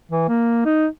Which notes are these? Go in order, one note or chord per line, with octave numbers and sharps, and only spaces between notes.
E3
A#3
D#4